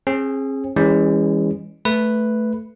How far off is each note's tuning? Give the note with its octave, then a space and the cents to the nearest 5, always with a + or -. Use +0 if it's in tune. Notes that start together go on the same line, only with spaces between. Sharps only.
C4 +45 G#4 +0
E3 -10 G#3 -35 C#4 +0
A3 +0 B4 +0